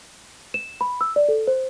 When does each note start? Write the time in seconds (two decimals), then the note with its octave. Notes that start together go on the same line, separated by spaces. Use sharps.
0.54 E7
0.81 B5
1.01 E6
1.16 D5
1.28 A4
1.47 C5